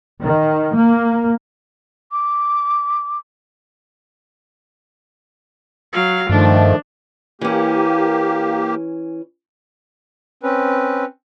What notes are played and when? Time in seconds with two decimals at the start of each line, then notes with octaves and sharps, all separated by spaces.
0.22 D#3
0.75 A#3
2.12 D6
5.93 F#3 F5
6.29 G2 D#3 F3 A3 D4
7.41 E3 A#3 C#4 G4
10.43 C4 C#4 B4